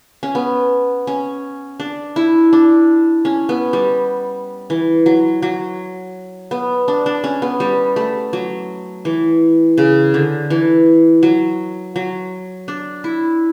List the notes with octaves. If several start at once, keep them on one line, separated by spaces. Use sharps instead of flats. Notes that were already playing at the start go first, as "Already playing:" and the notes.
C#4
B3
C#4
D4
E4
D4
C#4
B3
G3
E3
F#3
F#3
B3
D4
D4
C#4
B3
G3
A3
F#3
E3
C#3
D3
E3
F#3
F#3
D4
E4